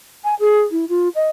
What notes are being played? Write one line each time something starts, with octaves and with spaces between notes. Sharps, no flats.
G#5
G#4
E4
F4
D#5